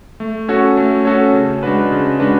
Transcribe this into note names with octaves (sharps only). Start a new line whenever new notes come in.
A3
C#4 F#4 A4 C#5
A3
C#4 F#4 A4 C#5
C#3
G#3 D4 F#4 B4
C#3
G#3 D4 F#4 B4